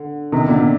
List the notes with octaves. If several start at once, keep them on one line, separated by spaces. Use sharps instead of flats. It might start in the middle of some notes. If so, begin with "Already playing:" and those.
Already playing: D3
C3 D#3
A#2 D3